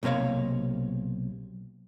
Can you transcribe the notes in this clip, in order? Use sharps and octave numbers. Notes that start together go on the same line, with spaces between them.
B1 C3 A#3 C#5 F5